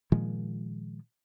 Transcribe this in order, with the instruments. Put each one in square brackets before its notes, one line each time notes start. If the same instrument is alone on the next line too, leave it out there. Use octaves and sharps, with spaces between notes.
[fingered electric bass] A#2 D#3 F3 G#3